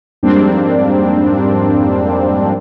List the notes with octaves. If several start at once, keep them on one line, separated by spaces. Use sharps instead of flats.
F2 G#2 G3 A#3 C4 D4